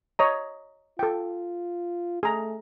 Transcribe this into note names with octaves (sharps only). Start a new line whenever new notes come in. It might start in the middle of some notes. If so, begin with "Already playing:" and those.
C#5 D#5 A#5
F4 A4 G5
A3 G#4 A#5